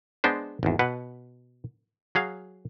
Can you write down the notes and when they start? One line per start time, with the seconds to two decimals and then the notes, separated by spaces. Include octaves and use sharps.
0.24 G#3 B3 D4 C5
0.63 G#1 E2
0.79 B2 B4 F#5
2.15 F#3 G#4 F5